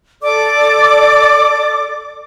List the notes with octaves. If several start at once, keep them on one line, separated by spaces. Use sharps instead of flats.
A4 D5 D6